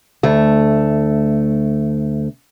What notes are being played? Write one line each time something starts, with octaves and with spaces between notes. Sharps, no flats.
D2 A3